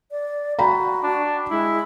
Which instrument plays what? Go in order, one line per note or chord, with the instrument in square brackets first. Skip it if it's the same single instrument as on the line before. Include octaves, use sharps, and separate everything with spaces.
[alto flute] D5
[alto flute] F#4 [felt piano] G5 A#5 B5
[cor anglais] D4
[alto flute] G#3 [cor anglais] E4